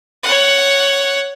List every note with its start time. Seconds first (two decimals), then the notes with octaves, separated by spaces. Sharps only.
0.23 C#5 F#5